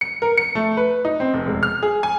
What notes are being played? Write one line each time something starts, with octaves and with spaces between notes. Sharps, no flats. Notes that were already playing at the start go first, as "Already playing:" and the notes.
C#7
A#4
C#7
A3
B4
D#4
C4
F1
E1
F6
G#4
G#5